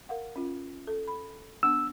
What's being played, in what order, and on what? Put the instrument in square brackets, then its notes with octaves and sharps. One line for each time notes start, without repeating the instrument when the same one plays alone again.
[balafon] A#4 F5 F#5
C#4 F4
A4
B5
[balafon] B3 D4 F#5 [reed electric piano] E6